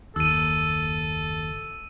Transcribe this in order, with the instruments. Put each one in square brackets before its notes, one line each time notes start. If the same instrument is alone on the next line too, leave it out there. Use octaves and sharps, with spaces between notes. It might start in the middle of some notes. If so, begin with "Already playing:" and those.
[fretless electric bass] F#1 D#2 [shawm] A4 [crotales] E6 D#7